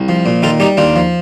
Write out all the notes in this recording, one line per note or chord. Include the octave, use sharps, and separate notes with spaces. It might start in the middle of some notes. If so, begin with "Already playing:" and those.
Already playing: C2
F3
A#2
D#3 F4 A4
G3 D#4 G4
D#2 D4 F4
F3